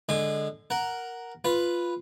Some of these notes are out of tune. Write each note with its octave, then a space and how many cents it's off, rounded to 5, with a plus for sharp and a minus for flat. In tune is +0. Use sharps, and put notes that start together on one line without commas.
D3 +0 G#3 +0 D#6 -35
A#4 +0 F#5 +0
F4 +0 B4 +0